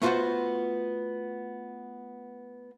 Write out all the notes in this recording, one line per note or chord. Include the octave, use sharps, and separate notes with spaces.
A3 B3 F4 F#4 C5 F#5